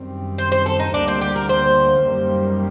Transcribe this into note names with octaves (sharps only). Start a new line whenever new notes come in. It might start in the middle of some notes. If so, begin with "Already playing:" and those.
Already playing: F#2 D#3 G3 C4
C5
C5
A4
D#4
D2 D3 G3 A#3 D4
C4
G4
A#4
C5
F#2 D#3 G3 A#3